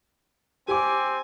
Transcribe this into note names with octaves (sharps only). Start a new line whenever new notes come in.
C4 G4 G#5 D6